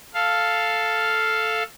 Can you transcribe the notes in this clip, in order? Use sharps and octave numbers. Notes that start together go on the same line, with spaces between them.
A4 F5